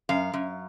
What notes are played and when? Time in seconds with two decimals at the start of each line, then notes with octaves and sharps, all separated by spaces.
0.09 F#2 F5
0.34 F#2